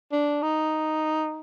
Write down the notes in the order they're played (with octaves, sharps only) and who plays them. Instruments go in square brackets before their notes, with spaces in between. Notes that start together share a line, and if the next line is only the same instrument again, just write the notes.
[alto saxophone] D4
D#4